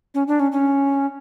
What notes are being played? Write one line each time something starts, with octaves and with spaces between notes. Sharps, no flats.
C#4
D4
C#4
C#4